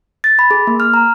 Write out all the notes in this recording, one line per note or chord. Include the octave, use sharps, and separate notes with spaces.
A6
B5
G#4
A#3
F6
A#5